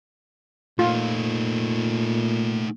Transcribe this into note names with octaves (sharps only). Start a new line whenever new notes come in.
A#2 A3 D#4 F4